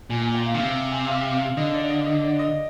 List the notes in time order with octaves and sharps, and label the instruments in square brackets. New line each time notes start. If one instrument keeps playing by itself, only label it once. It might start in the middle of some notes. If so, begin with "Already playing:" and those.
[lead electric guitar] A#2 [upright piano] G#5
[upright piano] G#5
G5
F5
[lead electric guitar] D3
[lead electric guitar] C3 [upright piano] F5
[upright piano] G#5
F5
F5
[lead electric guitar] D3 [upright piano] D#5
[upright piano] D5
D#5
D#5
D5
D#5